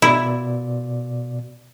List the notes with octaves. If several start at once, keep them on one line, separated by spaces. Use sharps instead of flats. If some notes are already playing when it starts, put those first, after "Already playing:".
B2 E4 D5